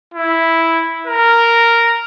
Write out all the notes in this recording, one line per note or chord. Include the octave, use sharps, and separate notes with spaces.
E4
A#4